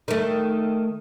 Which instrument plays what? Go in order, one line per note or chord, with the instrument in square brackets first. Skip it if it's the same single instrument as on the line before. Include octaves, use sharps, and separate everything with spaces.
[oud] D#3 A3